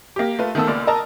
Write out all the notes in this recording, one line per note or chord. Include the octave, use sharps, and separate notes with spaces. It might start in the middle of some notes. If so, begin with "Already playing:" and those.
A#3 G4
A3 F4 B4
D#3 A3 B3 A4 E6
C#2 A#3 D5 C6 F6
A#4 D#5 A5 A#5